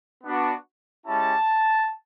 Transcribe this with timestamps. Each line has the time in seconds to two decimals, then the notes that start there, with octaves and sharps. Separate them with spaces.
0.24 B3 D4 F#4
1.06 G#3 C#4 E4 G4 A5